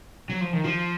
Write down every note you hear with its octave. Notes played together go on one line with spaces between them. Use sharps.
F#3
F3
D#3
F3